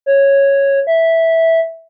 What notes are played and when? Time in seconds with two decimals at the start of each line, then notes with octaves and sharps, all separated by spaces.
0.06 C#5
0.87 E5